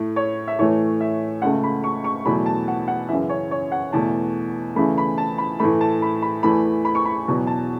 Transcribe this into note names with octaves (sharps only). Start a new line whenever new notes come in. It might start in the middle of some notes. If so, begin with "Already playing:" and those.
Already playing: A2 A3
C#5
E5
A2 E3 A3 C#5
E5
C#2 C#3 A3 F#5
B5
C#6
C#6
E2 B2 F#3 A3 B5
A5
F#5
F#5
F#2 C#3 E3 E5
C#5
C#5
F#5
E2 B2 A3 A5
E2 C#3 E3 A3 B5
B5
A5
B5
A2 E3 A3 B5
A5
B5
B5
E2 E3 A3 B5
B5
C#6
B5
E2 B2 F#3
A5